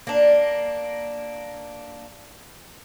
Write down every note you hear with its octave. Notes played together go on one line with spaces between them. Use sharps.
A#3 D4